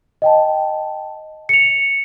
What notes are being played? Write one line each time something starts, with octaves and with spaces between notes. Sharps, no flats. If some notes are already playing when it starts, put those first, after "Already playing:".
D#5 G5 A5
C#7 F7